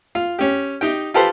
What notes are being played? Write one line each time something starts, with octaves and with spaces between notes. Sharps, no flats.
F4
C#4 G4
D#4 G4 G5
F4 G4 A4 B4 C5